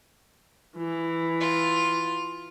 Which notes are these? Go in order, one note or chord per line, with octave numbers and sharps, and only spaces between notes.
E3
F4